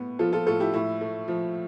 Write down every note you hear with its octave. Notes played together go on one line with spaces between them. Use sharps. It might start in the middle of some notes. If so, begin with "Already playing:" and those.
Already playing: A2 B3
F3 F4 A4
F4 A4
A2 F4 A4
E4 G4
A2 E4
A3
F3